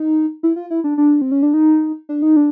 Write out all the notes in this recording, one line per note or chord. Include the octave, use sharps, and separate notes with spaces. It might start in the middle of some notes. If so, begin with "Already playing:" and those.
Already playing: D#4
E4
F4
E4
D4
D4
C4
C#4
D4
D#4
D4
D#4
D4